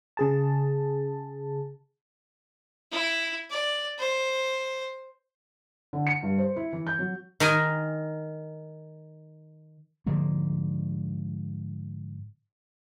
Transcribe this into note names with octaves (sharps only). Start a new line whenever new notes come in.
C#3 G#4 A5
E4
D5
C5
D3
C#7
G2
C5
E4
E3
G6
F#3
D#3 A#4 D#5 G#5
G#2 D3 F3 A#3